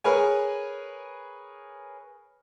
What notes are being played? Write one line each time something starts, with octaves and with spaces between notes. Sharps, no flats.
G#4 A#4 B4 C#5 G#5